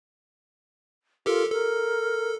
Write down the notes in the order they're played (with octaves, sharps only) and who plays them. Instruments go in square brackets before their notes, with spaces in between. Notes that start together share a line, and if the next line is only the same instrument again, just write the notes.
[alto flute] F4 [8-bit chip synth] G4 A4 A#4
[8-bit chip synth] A4 [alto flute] A#4